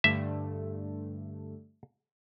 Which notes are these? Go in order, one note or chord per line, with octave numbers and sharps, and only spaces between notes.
G2 D3 A3 E5